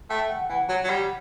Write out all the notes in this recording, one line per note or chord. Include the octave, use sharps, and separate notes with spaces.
A3 G5
F#5
E3 F#5
F#3
F#3
G3